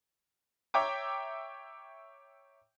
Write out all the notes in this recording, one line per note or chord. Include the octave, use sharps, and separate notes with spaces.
C#5 E5 G5 A#5 D6